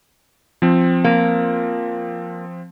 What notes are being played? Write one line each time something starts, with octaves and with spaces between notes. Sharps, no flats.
F3 C4
A#3